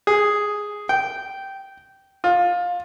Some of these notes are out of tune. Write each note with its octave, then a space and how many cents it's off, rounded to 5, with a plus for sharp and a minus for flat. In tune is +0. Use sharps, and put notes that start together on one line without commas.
G#4 +0
G5 -10
F4 +20